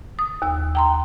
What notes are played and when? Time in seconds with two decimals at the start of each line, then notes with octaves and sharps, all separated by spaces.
0.19 D#6
0.42 D#2 E6
0.75 G5 A#5 C6